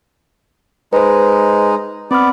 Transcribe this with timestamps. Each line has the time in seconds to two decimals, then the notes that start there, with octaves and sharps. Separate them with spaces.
0.93 G#3 D#4 B4 C5
2.11 B3 C4 D5 F6